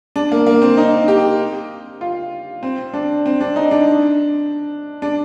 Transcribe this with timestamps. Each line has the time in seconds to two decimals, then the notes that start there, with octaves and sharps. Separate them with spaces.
0.16 D4
0.32 A#3
0.47 A#3
0.62 C4
0.77 D#4
1.08 G4
2.01 F4
2.63 C4
2.93 D4
3.26 C4
3.41 D4
3.56 D#4
3.71 D4
5.02 D4